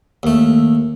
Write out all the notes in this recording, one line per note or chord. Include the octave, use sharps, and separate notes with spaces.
D#2 A3